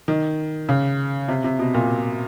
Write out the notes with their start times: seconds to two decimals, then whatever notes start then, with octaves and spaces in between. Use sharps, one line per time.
0.08 D#3
0.69 C#3
1.28 C3
1.44 C3
1.59 B2
1.74 A#2